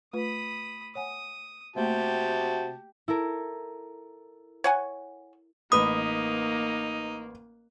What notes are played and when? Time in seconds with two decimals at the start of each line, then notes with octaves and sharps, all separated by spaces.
0.13 A3 F4 B4 B5 D#6
0.95 C#5 F#5 G#5 D#6
1.76 C3 A3 A#3 F#4 G4 G5 A5
3.08 E4 A4 A#4
4.64 C#5 F#5 G#5
5.72 A1 A#3 D#4 B4 B5 D#6